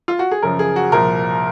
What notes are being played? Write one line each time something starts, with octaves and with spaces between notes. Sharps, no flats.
F4
F#4
G#4
F#2 C#3 F3 A#4
G#4
F#4
C2 A#2 F3 A#4